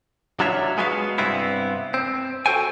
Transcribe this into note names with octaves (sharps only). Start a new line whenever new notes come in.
F#3 D4 F4 C#5 E5
G#3 B3 F#4 E5 F5
G2 C3 B3 C4 E4
C4
F#4 A4 C5 G5 G#5